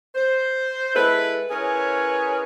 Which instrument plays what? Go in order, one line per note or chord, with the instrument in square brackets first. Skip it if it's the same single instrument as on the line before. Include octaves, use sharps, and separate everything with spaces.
[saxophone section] C5
G#3 E4 A4 B4
C#4 E4 G#4 A#4 B4 C#5